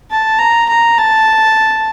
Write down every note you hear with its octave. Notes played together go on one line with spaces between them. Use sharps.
A5
A#5
A#5
A5